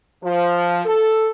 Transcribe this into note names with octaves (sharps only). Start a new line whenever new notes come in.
F3
A4